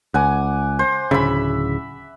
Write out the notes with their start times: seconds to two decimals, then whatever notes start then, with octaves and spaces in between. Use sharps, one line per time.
0.14 C#2 F#5 G#5 D6
0.79 C5
1.11 D1 A#1 C#3 E5 B5